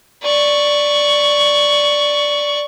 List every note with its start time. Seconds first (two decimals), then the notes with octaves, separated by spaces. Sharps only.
0.23 D5 C#6